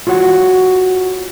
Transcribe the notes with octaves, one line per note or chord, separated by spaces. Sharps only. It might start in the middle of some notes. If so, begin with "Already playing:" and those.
F4 F#4 C#5 F#5